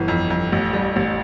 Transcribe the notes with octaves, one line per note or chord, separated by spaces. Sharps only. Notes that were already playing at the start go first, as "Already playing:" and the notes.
Already playing: G1 E3
F2
F2
A1
G3
A1